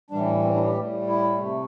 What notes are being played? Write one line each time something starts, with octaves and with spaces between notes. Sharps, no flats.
A2 E3 G3 D4
C4
D4
G4
A2 G3
E4
C3 A3